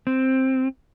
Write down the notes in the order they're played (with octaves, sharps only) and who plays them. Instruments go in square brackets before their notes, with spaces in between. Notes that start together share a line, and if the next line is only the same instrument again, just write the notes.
[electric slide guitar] C4